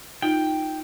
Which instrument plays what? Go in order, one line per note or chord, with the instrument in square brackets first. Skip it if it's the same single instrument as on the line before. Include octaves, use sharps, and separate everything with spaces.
[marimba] D#4 F4 [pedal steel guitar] G5